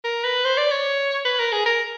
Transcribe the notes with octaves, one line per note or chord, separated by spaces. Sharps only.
A#4
B4
C5
D5
C#5
B4
A#4
G#4
A#4